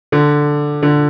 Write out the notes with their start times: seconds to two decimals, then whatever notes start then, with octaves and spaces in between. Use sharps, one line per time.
0.12 D3
0.82 D3